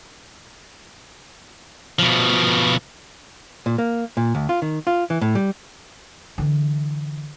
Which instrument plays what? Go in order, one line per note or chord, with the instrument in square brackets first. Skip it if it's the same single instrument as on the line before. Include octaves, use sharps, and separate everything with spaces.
[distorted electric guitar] B2 F3
[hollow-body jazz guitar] A#2
A#3
A#2
D2
F4
D#3
F4
E3
A2
G3
[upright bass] D3 E3